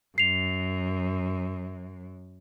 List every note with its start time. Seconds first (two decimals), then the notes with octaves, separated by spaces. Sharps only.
0.18 F#2 C7 F7